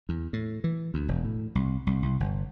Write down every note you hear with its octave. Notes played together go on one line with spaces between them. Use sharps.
E2
A2
E3
D2
E1
A2
C2
C2
C2
G1